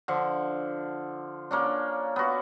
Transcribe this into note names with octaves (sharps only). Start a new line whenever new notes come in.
D3 F3
A#3 C#4 D4
B3 F#4